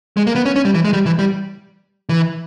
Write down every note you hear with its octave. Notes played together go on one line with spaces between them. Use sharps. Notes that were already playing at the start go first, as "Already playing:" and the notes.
G#3
A#3
B3
C#4
C#4
G3
E3
G#3
G3
E3
G3
E3